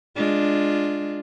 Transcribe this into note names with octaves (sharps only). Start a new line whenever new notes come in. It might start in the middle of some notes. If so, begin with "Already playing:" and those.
G#3 D4 F4